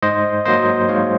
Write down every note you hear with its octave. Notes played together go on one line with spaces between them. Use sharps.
G#2 C5 D#5
F#3 A#3 C5 D#5
G#2 C#5 F5